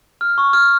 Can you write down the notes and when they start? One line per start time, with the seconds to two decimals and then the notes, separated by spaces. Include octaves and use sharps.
0.21 F6
0.38 C#6
0.53 F6